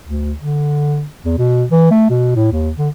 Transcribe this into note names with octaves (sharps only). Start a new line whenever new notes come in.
D2
D3
E2
B2
E3
A3
B2
A2
D#2
D3